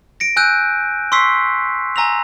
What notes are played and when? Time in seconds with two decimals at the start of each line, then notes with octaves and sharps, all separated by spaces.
0.20 A#6 C#7 D7
0.36 G#5 E6 F#6 G6 D#7
1.12 C6 C#6 E6 B6 C7
1.96 G#5 A#5 E6 A#6 F7